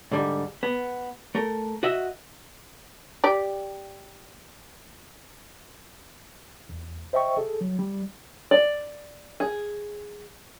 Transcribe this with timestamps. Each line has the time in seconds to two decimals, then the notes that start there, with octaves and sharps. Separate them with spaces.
0.11 G#2 D3 G3
0.63 B3
1.35 A3 A#4
1.83 F#4 D#5 E5
3.24 G4 D5
6.69 E2
7.13 C5 D#5 E5 G5 C#6
7.37 G#4 A4
7.61 F#3
7.79 G3
8.51 D5
9.40 G#4